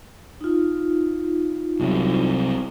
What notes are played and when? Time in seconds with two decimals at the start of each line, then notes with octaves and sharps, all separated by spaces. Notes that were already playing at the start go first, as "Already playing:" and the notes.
0.41 D#4 F4
1.79 C2 C3 F#3